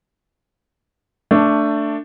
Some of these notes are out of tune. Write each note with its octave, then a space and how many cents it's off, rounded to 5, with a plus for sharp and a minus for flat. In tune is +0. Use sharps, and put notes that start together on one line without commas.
A3 +15 D4 +0